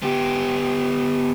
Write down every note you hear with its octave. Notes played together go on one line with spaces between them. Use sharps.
B3 G4